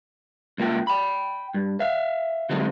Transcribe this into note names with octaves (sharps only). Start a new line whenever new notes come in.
C#2 A#3 F4 G5
G5 B5
G2
E5 F5
D3 F#3 G#3 A3 C4 D#4